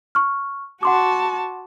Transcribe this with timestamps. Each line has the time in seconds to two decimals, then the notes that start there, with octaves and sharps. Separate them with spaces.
0.15 C#6 F6
0.83 F#4 F#5 A5 C6 D6